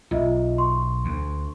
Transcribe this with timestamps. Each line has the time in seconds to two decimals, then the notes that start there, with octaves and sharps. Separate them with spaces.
0.11 B1 F4 D#5 E5
0.58 C6 C#6
1.05 D2